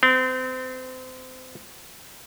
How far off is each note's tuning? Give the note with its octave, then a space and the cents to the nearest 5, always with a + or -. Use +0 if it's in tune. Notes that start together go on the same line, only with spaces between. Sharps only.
C4 -30